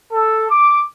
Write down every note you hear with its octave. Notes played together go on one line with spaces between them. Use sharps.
A4
D6